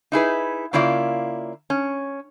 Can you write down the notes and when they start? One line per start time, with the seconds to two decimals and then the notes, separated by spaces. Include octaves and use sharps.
0.12 D#4 E4 G#4 B4
0.73 C#3 A#3 E4 F4 D5
1.70 C#4